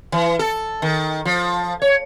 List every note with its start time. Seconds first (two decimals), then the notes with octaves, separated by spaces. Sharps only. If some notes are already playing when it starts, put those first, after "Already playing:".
0.12 E3
0.39 A4
0.82 D#3
1.25 F3
1.82 C#5